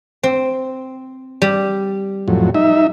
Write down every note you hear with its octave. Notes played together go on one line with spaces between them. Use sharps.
C4
G3
F2 A2 F#3
D#4 E5